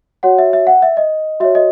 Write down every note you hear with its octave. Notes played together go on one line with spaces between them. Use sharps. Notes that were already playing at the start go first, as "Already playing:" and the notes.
F#4 C#5 F#5
E5
E5
F#5
E5
D#5
F#4 C#5 E5
D#5